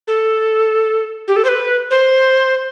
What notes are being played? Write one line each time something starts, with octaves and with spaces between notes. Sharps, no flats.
A4
G4
A4
C5
B4
C5